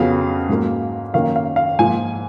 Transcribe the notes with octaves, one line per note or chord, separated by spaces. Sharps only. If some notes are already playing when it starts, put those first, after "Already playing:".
Already playing: F2 C#3 F#3 B3 F5
G#2 F#3 A#3
F#2 D#3 A#3 C#4 F5
F5
F5
G#2 F3 A#3 G#5